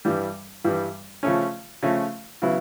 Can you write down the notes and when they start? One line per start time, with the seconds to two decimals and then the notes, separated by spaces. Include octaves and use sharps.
0.05 G2 E3 G3
0.65 G2 E3 G3
1.23 C#3 F3 A3 C#4
1.83 C#3 F3 A3 C#4
2.42 C#3 F#3 B3 E4